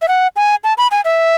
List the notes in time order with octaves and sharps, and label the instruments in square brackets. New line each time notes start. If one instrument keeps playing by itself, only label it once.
[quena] E5
F#5
G#5
A5
B5
G#5
E5